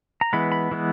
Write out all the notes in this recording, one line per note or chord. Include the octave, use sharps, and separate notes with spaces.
A#5
E3 G#3 B3 B5
B5
E3 G#3 B3